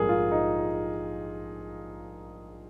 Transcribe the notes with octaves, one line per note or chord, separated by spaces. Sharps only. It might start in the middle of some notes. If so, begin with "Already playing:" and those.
Already playing: A#1 G#2 G3 A#3 G#4 A#4
F4
D#4